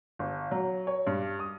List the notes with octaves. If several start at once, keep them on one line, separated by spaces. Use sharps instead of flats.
G1
F#3
C#5
G2
D#6